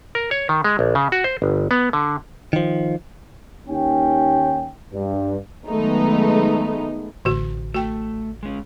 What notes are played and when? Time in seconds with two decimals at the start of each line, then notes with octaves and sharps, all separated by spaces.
0.15 A#4
0.31 C#5
0.49 D#3
0.64 G#3
0.79 A#1
0.95 C#3
1.12 F#4
1.24 C5
1.42 G1
1.71 B3
1.93 D3
2.53 D#3 F3
3.67 D#2 C#4 G5
4.92 G2
5.68 D#3 F#3 G#3 A3 B3 D#4
7.25 A1 D3 F#4
7.74 A3 F#4 G5
8.43 G#3 C#4